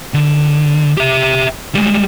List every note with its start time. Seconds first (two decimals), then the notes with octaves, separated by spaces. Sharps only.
0.14 D3
0.97 G4 E5
1.75 G3 G#3